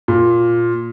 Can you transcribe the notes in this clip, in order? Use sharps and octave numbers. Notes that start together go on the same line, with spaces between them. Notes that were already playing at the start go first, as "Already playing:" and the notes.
A#2